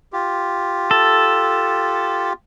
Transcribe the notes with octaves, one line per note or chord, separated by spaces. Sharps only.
F4 G4
A4